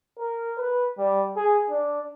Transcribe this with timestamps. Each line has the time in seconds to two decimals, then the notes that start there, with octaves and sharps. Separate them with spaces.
0.19 A#4
0.58 B4
0.98 G3
1.37 G#4
1.70 D4